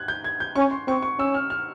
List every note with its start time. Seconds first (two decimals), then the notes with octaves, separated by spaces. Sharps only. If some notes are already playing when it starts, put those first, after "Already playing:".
Already playing: F#6 G#6
0.08 G6
0.24 G#6
0.40 G6
0.55 C#4 C#6
0.71 C6
0.87 C4 C#6
1.03 C#6
1.19 C#4 E6
1.35 F6
1.50 F6